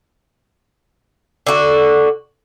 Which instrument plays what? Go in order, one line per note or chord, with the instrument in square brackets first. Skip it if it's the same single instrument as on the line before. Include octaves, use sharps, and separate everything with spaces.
[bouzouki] D3 F#4